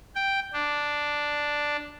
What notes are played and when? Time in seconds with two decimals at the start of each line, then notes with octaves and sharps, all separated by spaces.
0.15 G5
0.53 D4